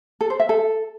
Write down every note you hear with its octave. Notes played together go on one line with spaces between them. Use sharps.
A4
C5
E5
A4